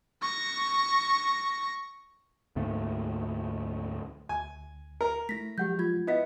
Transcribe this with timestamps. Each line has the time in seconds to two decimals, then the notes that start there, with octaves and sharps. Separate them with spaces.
0.22 C#6 A#6
2.56 D2 G#2 A3 A#3
4.29 D2 G#5
5.01 A#4
5.29 A3 E4 A#6 B6
5.58 F3 F#3 G#3 G4 F#5 G6
5.79 F4 G#6
6.07 B3 E4 D#5 E5 F#5 B6